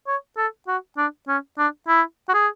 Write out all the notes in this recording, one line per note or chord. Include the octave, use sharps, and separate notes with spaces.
C#5
A4
F#4
D4
C#4
D4
E4
F#4
G#4